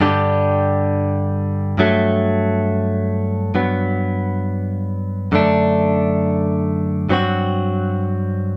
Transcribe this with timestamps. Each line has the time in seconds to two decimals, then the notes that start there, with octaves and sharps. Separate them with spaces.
0.01 G2 D3 G3 D4 G4
1.78 G2 F#3 A3
3.55 G2 F#3 B3
5.32 F#2 D3 A3 D4
7.09 G2 F#3 C4 F#4